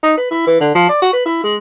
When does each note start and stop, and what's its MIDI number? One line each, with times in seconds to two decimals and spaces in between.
0.03 0.14 63
0.17 0.27 71
0.31 0.43 64
0.47 0.59 52
0.60 0.70 50
0.75 0.88 53
0.89 1.00 74
1.01 1.13 66
1.13 1.22 71
1.25 1.41 64
1.44 1.56 56